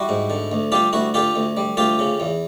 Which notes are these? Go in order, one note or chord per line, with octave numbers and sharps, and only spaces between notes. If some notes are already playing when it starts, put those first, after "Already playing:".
Already playing: G3 E4 F#4
G#2
D3
D2
G3 F4 G4
D2 E4 F#4
D3 F4 G4
D2
G3
D2 F4 G4
C#3
E2